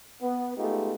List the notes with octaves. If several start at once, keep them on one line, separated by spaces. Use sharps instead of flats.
B3
G#3 A3 B3 D#4 F4 G4